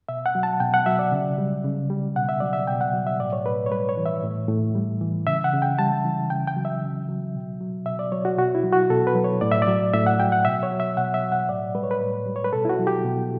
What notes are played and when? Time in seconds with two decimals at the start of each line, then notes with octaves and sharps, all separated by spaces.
0.09 B2 E5
0.26 F#5
0.35 F#3
0.43 A5
0.60 B2 G5
0.74 F#5
0.86 F#3 E5
0.99 D5
1.12 C#3
1.38 G3
1.64 C#3
1.90 G3
2.16 B2 F#5
2.29 E5
2.40 F#3 D5
2.53 E5
2.68 B2 G5
2.81 F#5
2.94 F#3
3.07 E5
3.20 A2 D5
3.33 C#5
3.46 A2 B4
3.66 C#5
3.71 G3 B4
3.89 C#5
3.97 E3
4.06 E5
4.23 A2
4.49 A2
4.75 G3
5.01 E3
5.27 C#3 E5
5.44 F#5
5.53 C#3
5.62 G5
5.79 G3 A5
6.05 E3
6.30 C#3 G5
6.48 G5
6.56 F#3
6.65 E5
6.83 C#3
7.08 F#3
7.35 B2
7.60 F#3
7.86 B2 E5
7.99 D5
8.12 F#3 C#5
8.25 F#4
8.38 B2 F#4
8.55 E4
8.64 F#3
8.73 F#4
8.90 B2 A4
9.07 B4
9.15 F#3
9.24 C#5
9.41 A2 D5
9.52 E5
9.62 D5
9.68 F#3
9.94 A2 E5
10.06 F#5
10.19 F#3 G5
10.32 F#5
10.45 B2 E5
10.63 C#5
10.71 F#3
10.80 E5
10.97 B2 F#5
11.14 E5
11.23 F#3
11.32 F#5
11.49 A2 D5
11.75 G3 B4
11.83 C#5
11.91 B4
12.01 A2
12.27 G3
12.36 C#5
12.44 B4
12.53 B2 A4
12.65 E4
12.69 F#4
12.79 F#3
12.87 G4
13.05 B2